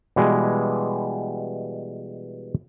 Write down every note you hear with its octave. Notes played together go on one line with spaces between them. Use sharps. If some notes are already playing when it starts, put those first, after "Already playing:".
B2 E3 G3 G#3